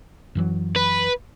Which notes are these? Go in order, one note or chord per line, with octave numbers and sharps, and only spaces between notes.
F#2 E3 F#3
B4